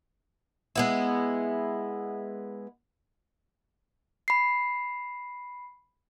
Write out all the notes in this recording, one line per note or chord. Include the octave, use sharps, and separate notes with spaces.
G#3 B3 E4
B5 C7